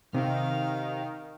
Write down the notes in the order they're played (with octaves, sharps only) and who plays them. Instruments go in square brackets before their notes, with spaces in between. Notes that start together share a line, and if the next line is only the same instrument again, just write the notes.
[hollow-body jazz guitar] C3 [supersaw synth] D#3 [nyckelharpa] F5